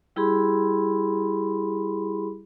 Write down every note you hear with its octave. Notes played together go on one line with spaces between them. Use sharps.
G3 E4 G4 G#4 B5 C6